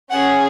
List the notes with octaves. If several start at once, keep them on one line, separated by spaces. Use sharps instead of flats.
C#4 G#4 F#5